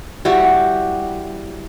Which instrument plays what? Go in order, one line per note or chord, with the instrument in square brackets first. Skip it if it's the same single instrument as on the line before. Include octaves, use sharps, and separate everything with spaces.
[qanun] G3 E4 F#4 G4